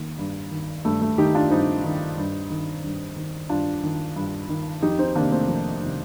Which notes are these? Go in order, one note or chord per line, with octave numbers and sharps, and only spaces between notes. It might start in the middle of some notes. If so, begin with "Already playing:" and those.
Already playing: D#3 A#3
G2
D#3
G2 A3
A3
D#3 D#4 G4
D4 F4
G2 C4 D#4
D#3
G2
D#3
G2
D#3
G2 D4 F4
D#3
G2
D#3
F2 D#4 G4
C4 D#4
C3 D#3 A#3 D4
A3 C4
F2
C3 D#3